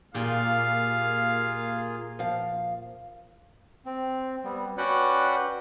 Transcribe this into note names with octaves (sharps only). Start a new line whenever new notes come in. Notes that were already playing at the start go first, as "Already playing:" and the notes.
A#2 A#3 F4 G4 G#4 F5
F3 F5
C4
G3 B3
C#4 F#4 B4 D5 F#5 G5